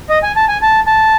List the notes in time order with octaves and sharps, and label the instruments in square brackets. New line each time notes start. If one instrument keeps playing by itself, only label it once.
[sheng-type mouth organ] D#5
G#5
A5
G#5
A5
A5